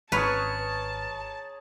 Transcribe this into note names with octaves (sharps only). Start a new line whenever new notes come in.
G#1 G#4 B4 C#5 A5 A#5 C#6 F6